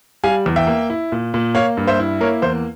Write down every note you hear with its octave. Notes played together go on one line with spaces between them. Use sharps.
G3 F5 G#5
E2
E5 G5
A#3
E4
A#2
A#2
A#3 C#5 F5
G2
C5 E5
E4
A#3 A#4 C#5
E2 C5